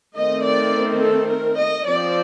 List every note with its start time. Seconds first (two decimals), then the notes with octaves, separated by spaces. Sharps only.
0.16 D#3 A3 C4 D#5
0.44 D5
1.00 A4
1.29 A#4
1.57 D#5
1.85 F3 C4 D5